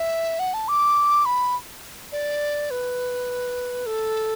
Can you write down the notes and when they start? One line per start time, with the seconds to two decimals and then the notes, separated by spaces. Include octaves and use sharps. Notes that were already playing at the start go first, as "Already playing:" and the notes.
Already playing: E5
0.39 F#5
0.54 A5
0.68 D6
1.26 B5
2.12 D5
2.71 B4
3.86 A4